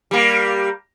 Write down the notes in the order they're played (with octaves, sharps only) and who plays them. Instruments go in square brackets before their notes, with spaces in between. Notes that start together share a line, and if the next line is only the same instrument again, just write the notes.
[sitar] G3 A#3